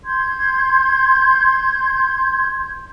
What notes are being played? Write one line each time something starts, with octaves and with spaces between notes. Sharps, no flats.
C6 G6 G#6